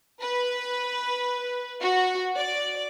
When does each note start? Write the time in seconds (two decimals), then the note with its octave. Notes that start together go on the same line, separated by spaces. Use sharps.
0.22 B4
1.81 F#4
2.36 D5